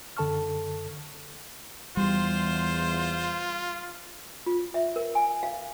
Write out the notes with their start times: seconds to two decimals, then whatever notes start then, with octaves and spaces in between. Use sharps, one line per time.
0.17 F#2 D3 A4 A5 C#6 F6
1.97 E2 G3 F4 C5
4.46 F4
4.74 E5
4.96 A#4
5.15 G#5
5.43 F5